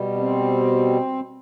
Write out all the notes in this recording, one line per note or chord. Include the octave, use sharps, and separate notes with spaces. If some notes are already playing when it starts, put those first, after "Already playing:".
Already playing: B2 G3
C4